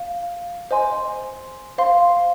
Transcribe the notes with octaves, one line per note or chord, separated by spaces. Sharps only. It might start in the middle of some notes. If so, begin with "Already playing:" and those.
Already playing: F5
C5 D#5 G#5 C6
C5 F5 C6